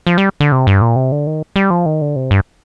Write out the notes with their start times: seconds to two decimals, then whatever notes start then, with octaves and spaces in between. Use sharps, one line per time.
0.07 F3
0.18 G3
0.40 D3
0.52 C3
0.67 G2
0.81 A#2
0.96 C3
1.12 D3
1.27 D#3
1.56 G3
1.70 F3
1.86 D#3
2.02 D3
2.16 C3
2.31 G2